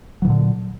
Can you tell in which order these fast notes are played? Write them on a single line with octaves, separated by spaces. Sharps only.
F#3 E3 A#2 D3